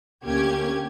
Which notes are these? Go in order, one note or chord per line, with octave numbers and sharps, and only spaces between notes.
D2 D3 A#3 C#4 G4 G#6